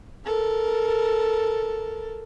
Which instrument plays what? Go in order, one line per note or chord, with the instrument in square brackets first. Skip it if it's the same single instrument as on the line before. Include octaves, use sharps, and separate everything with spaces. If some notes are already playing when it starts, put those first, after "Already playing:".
[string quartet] A4 A#4